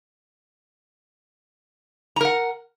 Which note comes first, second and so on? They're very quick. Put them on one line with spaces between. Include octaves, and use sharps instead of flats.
A#5 A#4 F#5